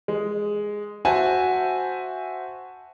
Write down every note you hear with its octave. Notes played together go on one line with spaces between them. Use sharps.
G#3
F#4 C5 E5 G#5 A5